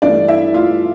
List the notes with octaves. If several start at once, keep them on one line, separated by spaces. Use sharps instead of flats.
G2 E3 A3 D4 D5
E4 E5
F4 F5